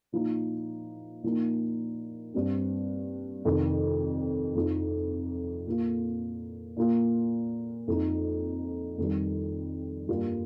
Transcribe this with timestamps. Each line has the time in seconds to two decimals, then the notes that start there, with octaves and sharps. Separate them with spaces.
0.12 A#2 F3 D#4
1.23 A#2 F3 A#3 D#4
2.34 G2 G3 C4
3.45 F2 C3 D#3
4.56 F2 F3 D#4
5.66 A#2 A#3 F4
6.77 A#2 A#3 F4
7.87 F2 F3 D#4
8.98 F2 D#3 G3
10.08 G2 G3 A#3 F4